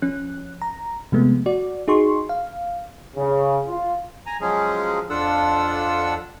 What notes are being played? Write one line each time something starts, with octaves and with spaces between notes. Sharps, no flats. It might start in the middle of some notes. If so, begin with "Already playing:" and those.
F3 C#4 F#6
A#5
C3 F3 G#3 A3 B3
F#4 D5
D#4 F#4 G#4 C6 C#6
F5
C#3
F4
G#5 A#5
F3 F#3 G#3 C#4 G#4
F2 D4 F4 A4 F#5 E6